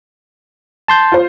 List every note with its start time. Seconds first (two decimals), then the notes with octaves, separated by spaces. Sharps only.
0.88 A5 C6 G6
1.12 F4 C5